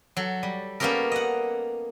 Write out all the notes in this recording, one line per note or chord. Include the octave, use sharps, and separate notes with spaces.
F#3 A4
G3
A#3 B3 C#4 G4 A4 A#4
D#5 F#5